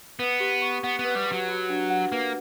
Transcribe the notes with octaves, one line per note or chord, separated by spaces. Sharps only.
B3 B4
G4
C#6
B3 F#5
B3
B4
G3
G4
F#3
F#4
D4
F#5
A#3 B4